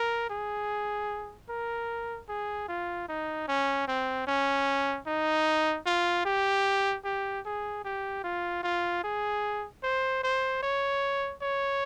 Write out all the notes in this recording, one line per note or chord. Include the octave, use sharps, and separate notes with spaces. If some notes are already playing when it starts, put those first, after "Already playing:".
Already playing: A#4
G#4
A#4
G#4
F4
D#4
C#4
C4
C#4
D#4
F4
G4
G4
G#4
G4
F4
F4
G#4
C5
C5
C#5
C#5